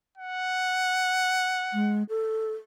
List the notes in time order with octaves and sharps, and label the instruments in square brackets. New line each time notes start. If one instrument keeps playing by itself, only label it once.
[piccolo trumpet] F#5
[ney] G#3
A4